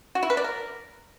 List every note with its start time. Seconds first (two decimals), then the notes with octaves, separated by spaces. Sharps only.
0.15 F#4
0.23 E4
0.30 B4
0.37 D5
0.44 A#4